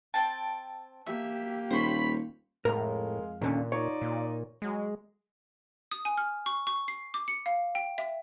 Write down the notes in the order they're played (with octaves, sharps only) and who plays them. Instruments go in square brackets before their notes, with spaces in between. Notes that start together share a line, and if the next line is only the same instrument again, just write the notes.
[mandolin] C4 G5 A5
[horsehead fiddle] A#3 G4 [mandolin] E5
[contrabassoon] D#1 [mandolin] C5 C#5 [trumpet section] B5
[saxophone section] F2 G#3 F5 [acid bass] A2 [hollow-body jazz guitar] A#4 A#5
[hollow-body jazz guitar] D#2 D3 C#4 [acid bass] A#2
[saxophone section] D#4 F4 D5 [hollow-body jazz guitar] C#5
[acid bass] A#2
[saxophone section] F#3 [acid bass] G#3
[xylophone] D#6
G#5
F6
C#6
C#6
C7
D6
C#7
F5
G5
E5